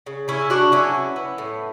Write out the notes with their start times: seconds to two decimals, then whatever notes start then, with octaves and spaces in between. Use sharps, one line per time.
0.06 C#3
0.28 C#3 C#4 E4
0.50 C#3 D4 F#4
0.72 F#3 C#4 E4
0.94 B3
1.16 B3
1.38 A2